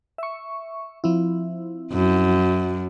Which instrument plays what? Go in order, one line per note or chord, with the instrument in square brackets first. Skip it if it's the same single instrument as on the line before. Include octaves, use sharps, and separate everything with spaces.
[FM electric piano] E5 C#6
F3 C4 E4
[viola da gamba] F#2